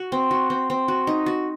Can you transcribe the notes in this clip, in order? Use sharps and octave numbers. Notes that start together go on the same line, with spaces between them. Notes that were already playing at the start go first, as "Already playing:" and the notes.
Already playing: F#4
C4
F#4
C4
C4
F#4
D#4
F#4